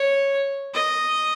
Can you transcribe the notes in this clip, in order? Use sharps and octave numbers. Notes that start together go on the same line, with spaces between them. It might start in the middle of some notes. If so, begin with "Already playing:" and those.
Already playing: C#5
D#5